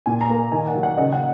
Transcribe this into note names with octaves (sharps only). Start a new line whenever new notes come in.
A#2 G#5
A#5
A#3
D#3 G#5
F#5
F#3
F#5
C#3 D#5
F#5